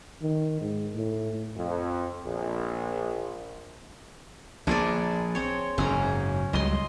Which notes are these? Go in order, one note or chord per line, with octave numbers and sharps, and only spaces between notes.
D#3
G#2
A2
F2
A#1
A#1 A#2 D4 G#4 D5
C4 C#5
F#1 G#2 C#4 A#5
C#2 F#3 G3 D#5 C6